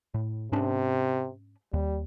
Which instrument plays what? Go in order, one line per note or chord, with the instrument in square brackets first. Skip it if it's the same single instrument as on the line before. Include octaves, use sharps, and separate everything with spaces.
[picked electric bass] A2
[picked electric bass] G#2 C#4 D4 [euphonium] C3
[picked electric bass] D#2 [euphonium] G3